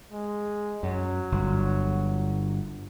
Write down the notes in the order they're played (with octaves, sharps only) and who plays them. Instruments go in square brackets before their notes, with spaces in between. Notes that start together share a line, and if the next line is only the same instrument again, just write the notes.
[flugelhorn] G#3
[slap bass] F#2 [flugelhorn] F#3
[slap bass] G1